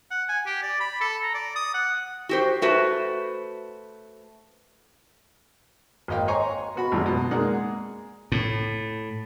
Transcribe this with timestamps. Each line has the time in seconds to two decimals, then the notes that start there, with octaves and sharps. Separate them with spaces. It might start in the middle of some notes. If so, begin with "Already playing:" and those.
0.11 F#5
0.29 G#5
0.46 G4
0.63 D5
0.80 B5
1.01 A4
1.23 A#5
1.34 D5
1.56 D#6
1.74 F#5
2.29 F#4 G4 C5
2.62 A3 F#4 B4 C5
6.08 G#1 A#3 D#5 F5 G5
6.28 C#5 D#5 G#5 A#5 C6 C#6
6.76 B3 F#4 B5
6.92 A1 F#2 G#3 E4 F4 D5
7.06 B2
7.31 G#3 A#3 D#4 G#4 D5 F#5
8.32 A2